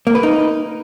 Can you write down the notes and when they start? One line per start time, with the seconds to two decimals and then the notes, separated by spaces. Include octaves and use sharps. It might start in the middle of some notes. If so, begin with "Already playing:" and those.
0.07 A#3
0.15 B4
0.23 D#4